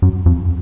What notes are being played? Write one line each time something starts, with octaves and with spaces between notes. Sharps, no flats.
F#2
F2